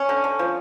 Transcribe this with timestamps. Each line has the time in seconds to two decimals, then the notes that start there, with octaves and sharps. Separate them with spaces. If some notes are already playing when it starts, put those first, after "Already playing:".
Already playing: C#4
0.09 D3
0.24 D3
0.39 F3